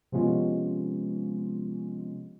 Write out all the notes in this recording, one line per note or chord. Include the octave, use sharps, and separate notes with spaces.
C3 F3 G#3 B3 C#4 F4